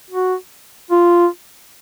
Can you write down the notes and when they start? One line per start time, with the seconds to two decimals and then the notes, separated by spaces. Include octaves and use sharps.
0.10 F#4
0.91 F4